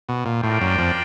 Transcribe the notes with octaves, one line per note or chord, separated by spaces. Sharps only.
B2
A#2
A2 D4 F4 A#4 D5 G5
F#2
F2